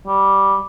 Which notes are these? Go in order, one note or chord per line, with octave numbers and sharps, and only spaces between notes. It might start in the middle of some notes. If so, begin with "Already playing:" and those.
G3